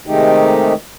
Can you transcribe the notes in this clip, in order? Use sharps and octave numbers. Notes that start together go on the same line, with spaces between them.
C3 D#3 G#3 A3 D#4 G4